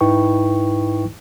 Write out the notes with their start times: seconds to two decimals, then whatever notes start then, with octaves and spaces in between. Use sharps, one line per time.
0.01 G#2 D#4 E4 B4 G5 C#6